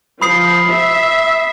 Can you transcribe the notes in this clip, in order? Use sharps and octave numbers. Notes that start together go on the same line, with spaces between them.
F3 B5 D#6 C7
E5